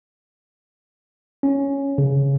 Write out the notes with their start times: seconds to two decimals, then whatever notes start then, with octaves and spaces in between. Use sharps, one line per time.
1.43 C#4
1.98 C#3